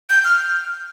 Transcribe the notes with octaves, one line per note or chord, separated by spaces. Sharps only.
G6
F6